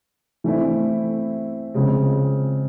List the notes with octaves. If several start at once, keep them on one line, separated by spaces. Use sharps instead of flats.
E3 A3 C4 E4
C#3 F3 G#3 C4